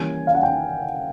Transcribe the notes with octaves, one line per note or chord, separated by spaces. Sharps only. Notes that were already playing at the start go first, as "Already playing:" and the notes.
Already playing: E3 G3 A#3 C#4 G#5
F5
F#5
G5